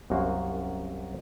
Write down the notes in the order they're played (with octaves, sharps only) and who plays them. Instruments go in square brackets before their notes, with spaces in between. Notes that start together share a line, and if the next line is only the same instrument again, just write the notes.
[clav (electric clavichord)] C2 F#2 A#3 F#4 C5